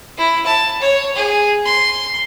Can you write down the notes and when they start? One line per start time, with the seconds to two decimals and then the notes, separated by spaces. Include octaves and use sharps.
0.17 E4
0.46 A5
0.81 C#5
1.16 G#4
1.65 C6